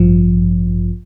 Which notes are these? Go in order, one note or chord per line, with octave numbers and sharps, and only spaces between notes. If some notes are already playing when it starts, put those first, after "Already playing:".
Already playing: A1 G2 F3